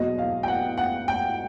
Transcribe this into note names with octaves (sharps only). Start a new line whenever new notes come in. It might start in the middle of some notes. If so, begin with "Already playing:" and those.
Already playing: E2 B2 F#3 A#3 D#5
F5
G5
F#5
F#5
G5